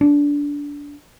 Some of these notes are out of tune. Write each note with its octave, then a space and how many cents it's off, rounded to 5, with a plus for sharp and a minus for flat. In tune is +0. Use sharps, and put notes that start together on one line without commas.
D4 -20